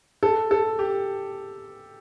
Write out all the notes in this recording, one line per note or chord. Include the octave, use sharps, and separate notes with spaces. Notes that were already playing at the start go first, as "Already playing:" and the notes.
A4
A4
G4